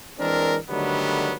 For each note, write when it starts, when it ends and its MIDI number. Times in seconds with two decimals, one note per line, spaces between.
0.19 0.55 52
0.19 0.55 56
0.19 0.55 60
0.19 0.55 62
0.19 0.55 70
0.68 1.33 50
0.68 1.33 51
0.68 1.33 54
0.68 1.33 55
0.68 1.33 57
0.68 1.33 59